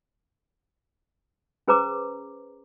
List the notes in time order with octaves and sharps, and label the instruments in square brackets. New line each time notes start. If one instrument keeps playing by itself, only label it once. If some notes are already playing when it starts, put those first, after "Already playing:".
[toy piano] C#4 G#4 B4 C5 A#5 D6